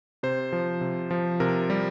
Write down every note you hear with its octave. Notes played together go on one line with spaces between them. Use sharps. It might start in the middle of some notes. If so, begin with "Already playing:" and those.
C3 C5
F3
C3
F3
C3 A#4
G3